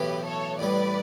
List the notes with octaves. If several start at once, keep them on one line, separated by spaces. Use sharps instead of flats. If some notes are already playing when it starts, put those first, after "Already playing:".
Already playing: B1 A2 E3 G4 B4
A4 C#5
A1 A2 G3 B4 D5